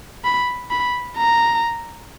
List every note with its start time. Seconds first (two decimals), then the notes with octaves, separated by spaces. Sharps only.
0.24 B5
0.71 B5
1.17 A#5